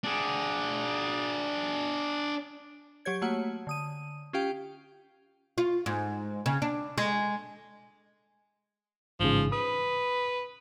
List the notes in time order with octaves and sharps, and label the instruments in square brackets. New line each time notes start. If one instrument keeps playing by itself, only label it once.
[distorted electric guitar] D4 G#4
[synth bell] F#3 G4 C#5 G#6
A3 A#3 F#4 C#5 F#5
D3 D#6 D#7
C#4 F4 G4 F5 G5
[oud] F4
G#2
C#3
D4
G#3
[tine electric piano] A1 G#2 C#3 [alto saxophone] F3
[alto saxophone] B4 [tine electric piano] D#6